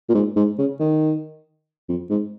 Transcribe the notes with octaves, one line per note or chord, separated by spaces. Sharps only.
A#2
G#2
G#2
C#3
D#3
F2
G#2